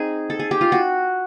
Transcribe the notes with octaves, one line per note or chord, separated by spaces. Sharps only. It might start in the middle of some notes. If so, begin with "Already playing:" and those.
Already playing: C4 D#4 G#4
A4
G#4
G4
F4
F#4